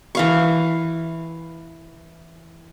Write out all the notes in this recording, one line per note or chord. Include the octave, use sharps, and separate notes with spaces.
E3 F5 C#6